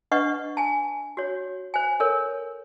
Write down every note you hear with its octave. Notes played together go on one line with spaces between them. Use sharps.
D4 B4 D#5 F#5 C#6
G#5 A5
F#4 C#5
C5 G#5
A4 A#4 C#5